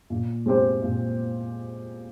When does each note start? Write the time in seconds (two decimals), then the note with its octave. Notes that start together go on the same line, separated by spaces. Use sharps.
0.10 A#2
0.46 G#3 C4 G4 C5
0.82 A#2